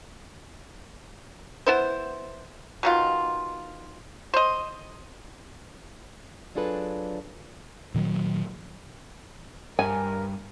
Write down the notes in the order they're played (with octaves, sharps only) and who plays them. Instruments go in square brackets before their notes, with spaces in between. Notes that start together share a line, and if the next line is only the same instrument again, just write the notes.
[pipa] B3 E4 C5
B2 D#3 F4
C5 D#5
[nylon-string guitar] F#3 D4 F4 G#4 A4 B4
[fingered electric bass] A#2 D#3 F3 F#3
[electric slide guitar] G2 [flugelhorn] A#4 [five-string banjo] G#5